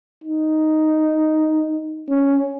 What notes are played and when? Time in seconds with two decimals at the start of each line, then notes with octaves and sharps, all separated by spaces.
0.24 D#4
2.10 C#4